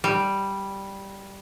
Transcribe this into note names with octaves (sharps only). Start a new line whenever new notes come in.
G3